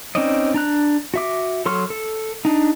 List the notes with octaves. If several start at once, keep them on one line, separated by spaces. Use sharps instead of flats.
C4 C#4 D#4 D5 D#5
D4 A#5 F#6
F#4 E5 D6
F#3 A4 C6 C#6 F6
A4
D4 D#4